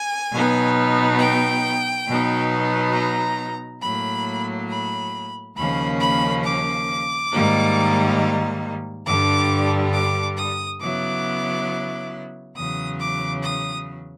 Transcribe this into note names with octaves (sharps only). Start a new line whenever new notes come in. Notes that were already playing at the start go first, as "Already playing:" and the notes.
Already playing: G#5
B2 F#3 B3 D#4
G5
B2 F#3 B3 D#4
A#5
A2 F#3 A#3 B5
B5
D#2 C#3 F3 A#3 C#4 B5
B5
D6
G#2 D#3 G3 A#3 D#4
G2 D3 G3 D6
D6
D#6
C#3 F#3 B3 E4 D6
E2 C#3 F#3 D#6
D6
D#6